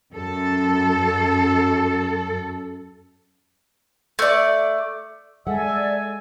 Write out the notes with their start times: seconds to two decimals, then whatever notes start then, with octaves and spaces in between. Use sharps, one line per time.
0.13 F#2 A4
4.19 A3 D5
5.47 G#3 A4 D5 E5 F#5 G#5